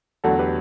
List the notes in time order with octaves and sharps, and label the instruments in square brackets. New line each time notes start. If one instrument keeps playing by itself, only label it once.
[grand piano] E2 D3 F#3 A3 F#4 A4
G4 B4